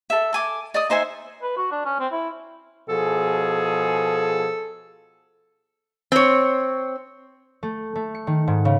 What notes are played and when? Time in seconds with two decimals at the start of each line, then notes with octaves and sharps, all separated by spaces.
0.10 A4 E5
0.33 A4 G#5 D6
0.74 D5 D#5 D#6
0.90 D#4 C5 E5 G#5
1.43 B4
1.57 F#4
1.72 D4
1.85 C#4
2.00 C4
2.12 E4
2.89 B2 F3 G#4 A4
6.12 C4 C#5
7.63 A3
7.95 A3
8.15 C#7
8.27 D#3
8.47 G#2
8.65 C#3